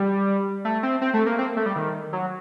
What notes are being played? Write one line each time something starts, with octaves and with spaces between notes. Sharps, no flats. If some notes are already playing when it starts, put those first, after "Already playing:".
Already playing: G3
A3
C4
C4
A3
A#3
C4
A3
G3
D#3
F#3